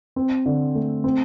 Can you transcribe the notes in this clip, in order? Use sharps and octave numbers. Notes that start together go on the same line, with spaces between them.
C4
D3
A3
C4